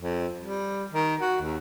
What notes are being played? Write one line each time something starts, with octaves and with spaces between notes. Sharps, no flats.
F2
G3
D#3
F#4
D#2